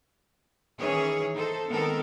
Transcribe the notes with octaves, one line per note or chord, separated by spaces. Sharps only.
D#3 E3 C#4 G#4 C#5
D#4 A4 C5
D#3 G#3 B3 C4 A4 A#4